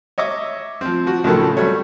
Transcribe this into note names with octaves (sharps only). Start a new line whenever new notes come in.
C#5 D#5 E5 D6
F3 C4
F3 F#4
C#2 A2 D#3 F3 F#3 A4
F#3 G3 A3 C#5